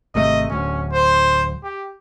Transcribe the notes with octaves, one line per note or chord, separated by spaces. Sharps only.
G#1 C3 A3 D#5
D1 D2 C#4
C5
G4